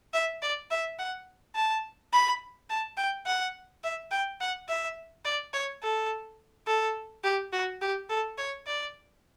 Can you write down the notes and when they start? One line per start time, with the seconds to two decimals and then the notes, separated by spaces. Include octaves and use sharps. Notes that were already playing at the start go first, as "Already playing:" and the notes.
0.14 E5
0.42 D5
0.71 E5
0.99 F#5
1.56 A5
2.13 B5
2.70 A5
2.97 G5
3.26 F#5
3.84 E5
4.11 G5
4.40 F#5
4.69 E5
5.25 D5
5.53 C#5
5.83 A4
6.67 A4
7.24 G4
7.53 F#4
7.82 G4
8.10 A4
8.38 C#5
8.67 D5